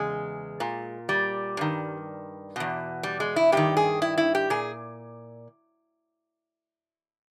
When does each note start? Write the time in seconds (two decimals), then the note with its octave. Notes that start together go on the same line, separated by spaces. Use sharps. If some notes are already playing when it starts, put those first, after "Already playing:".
Already playing: E2 C#3 G#3
0.60 A#2
1.09 G3
1.57 G2 D#3
2.56 E2 B2
3.03 G3
3.20 G#3
3.36 E4
3.52 G2 D#3 G4
3.77 G#4
4.02 E4
4.18 E4
4.35 G4
4.50 A#2 G#4